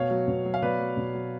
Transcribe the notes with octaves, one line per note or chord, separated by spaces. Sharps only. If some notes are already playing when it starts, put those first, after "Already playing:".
Already playing: B2 C#5 F5
F#3
B2
F#3
F5
B2 B4 D5
F#3
B2
F#3